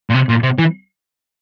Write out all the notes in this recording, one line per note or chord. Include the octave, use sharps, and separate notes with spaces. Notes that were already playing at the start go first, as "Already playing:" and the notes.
A#2
C3
A#2
C3
E3